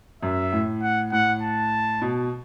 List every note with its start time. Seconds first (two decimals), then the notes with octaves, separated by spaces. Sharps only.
0.23 F#2 E5
0.52 A2
0.83 F#5
1.12 A2 F#5
1.42 A5
2.02 B2